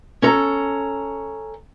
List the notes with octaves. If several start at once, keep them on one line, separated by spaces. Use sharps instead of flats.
C#4 A4 A#5